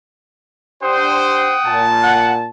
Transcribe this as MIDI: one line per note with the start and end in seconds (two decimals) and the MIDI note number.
0.83 1.56 62
0.83 1.56 67
0.83 1.56 72
0.83 1.95 78
0.83 1.95 79
0.83 1.95 87
1.66 2.50 46
1.66 2.50 81
2.02 2.32 78